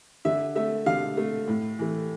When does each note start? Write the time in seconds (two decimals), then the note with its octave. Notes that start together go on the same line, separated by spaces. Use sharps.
0.25 D3 E5
0.56 A3 E5
0.86 D3 F5
1.17 A3
1.48 A2
1.79 E3 A3